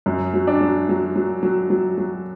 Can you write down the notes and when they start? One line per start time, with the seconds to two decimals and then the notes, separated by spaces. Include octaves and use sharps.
0.06 F#2
0.34 F#3
0.47 D4
0.61 F#3
0.89 F#3
1.16 F#3
1.43 F#3
1.70 F#3
1.98 F#3